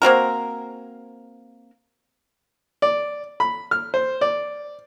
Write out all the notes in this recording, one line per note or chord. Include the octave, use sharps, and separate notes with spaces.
A#3 C4 F#4 A#4
D5
B5
F6
C5
D5